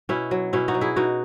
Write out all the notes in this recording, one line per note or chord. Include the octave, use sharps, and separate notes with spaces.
B2 C#4 E4
F#3
B2 C#4 E4
D#4 F#4
F#3
E4 G#4
B2 D#4 F#4